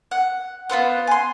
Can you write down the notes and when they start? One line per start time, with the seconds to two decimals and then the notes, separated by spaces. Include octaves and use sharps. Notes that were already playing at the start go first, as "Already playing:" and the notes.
0.11 F#5
0.69 B3 F4 C5 F#5
1.07 G#5 C6